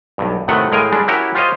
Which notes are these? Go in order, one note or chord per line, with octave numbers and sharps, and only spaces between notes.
B1 G2
A2 C3 D#3 A3 F#4 F#5
A2 G#3 A#4 F5 G5 G#5
G3 G#3 D4
C#4 E4 F#4 G4 A#4 C#5
F4 G4 C5 C#5 D#5 F5